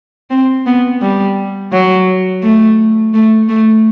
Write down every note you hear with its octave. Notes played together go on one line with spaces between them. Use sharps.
C4
B3
G3
F#3
A3
A3
A3